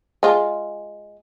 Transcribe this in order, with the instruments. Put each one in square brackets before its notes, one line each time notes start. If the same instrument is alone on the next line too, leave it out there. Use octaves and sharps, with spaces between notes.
[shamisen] G#3 F4